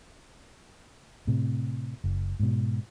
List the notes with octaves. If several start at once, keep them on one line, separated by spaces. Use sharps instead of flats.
A2 C3
F#1
G#2 B2